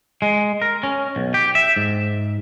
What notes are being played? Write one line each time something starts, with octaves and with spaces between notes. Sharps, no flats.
G#3
A#4
C#4
B1
G4
E5
G#2